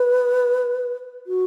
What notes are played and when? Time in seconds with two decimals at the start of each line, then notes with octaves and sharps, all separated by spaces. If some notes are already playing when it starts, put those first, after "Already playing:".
Already playing: B4
1.27 F#4